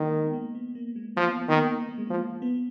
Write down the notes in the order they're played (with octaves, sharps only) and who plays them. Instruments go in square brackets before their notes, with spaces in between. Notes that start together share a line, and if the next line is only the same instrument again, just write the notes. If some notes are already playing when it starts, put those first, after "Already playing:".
Already playing: [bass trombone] D#3 [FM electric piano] A#3
[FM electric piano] G#3
B3
A#3
B3
A#3
G#3
[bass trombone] F3 [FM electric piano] A#3
[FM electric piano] B3
A#3
[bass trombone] D#3
[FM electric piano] B3
A#3
B3
A#3
G#3
[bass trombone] F3 [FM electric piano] A#3
[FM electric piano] B3